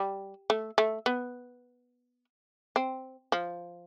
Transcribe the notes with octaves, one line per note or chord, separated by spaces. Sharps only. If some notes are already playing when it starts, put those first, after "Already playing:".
Already playing: G3
A3
A3
B3
C4
F3